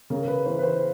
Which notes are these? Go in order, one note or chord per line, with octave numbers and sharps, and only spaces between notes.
C#3 A#4
B4
E3 C5
B4
C5